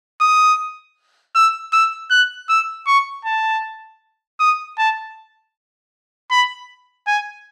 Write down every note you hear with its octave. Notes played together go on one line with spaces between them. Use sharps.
D#6
E6
E6
F#6
E6
C#6
A5
D#6
A5
B5
G#5